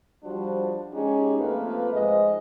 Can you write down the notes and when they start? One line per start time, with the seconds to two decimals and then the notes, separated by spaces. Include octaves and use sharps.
0.24 F3 G3 D4 F#4 C5
0.93 G#3 C#4 D#4 G4 G#4
1.38 F2 A3 A#3 F4 B4
1.92 G#2 F3 G#3 D#5